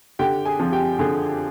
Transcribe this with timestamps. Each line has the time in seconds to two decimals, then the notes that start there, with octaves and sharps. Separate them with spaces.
0.19 D3 G4 G5
0.45 G#4 G#5
0.60 F3 C4
0.72 G4 G5
0.99 D3 G#4 G#5